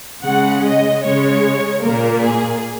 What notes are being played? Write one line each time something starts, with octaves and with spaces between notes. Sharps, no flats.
C#3 G#3 F#5
D#5
C#3 G#3 C#5
A#2 A#3 A#4
G#4